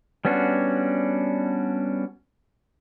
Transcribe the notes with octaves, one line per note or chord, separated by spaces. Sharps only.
G3 B3 C#4 D4 F#4